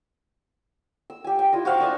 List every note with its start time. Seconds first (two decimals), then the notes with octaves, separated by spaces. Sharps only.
1.10 E6
1.24 G4 G#5
1.39 G5
1.52 E4 F4 D#5
1.65 F#4 C5 F5 C#6
1.80 D4 D#5 G#5 E6